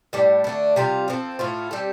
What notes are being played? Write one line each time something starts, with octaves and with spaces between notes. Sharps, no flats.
A2 G3 D4
D3 A3 D4
C3 G3 F4
F3 C4 A4
A2 A3 F4
G3 C4 A4